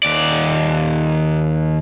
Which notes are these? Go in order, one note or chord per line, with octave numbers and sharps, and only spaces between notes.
D#2 D5